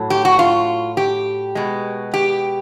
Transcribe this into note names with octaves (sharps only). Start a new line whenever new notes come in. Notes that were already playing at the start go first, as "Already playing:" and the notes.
Already playing: A2 F#3
G4
F#4
F4
G4
B2 G#3
G4